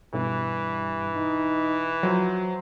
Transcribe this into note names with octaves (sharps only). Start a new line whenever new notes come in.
G2 B2 E3
D#4
F3 F#3 C5